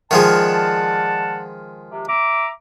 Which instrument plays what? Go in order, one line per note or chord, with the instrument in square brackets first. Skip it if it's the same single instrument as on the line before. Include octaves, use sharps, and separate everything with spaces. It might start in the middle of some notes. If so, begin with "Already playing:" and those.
[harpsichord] D#3 F3 G#3 [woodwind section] D5 F#5 A5
[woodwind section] C3
E5 A#5 D6